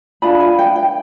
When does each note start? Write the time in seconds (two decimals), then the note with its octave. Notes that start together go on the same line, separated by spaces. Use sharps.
0.22 D4 F4 G#4 B4 B5
0.40 G#5
0.59 G5
0.76 G5